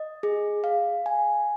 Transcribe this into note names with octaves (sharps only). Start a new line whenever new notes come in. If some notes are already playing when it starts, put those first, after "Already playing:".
Already playing: D#5
G#4
F5
G#5